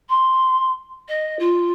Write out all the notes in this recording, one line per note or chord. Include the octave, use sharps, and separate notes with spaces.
C6
D#5
F4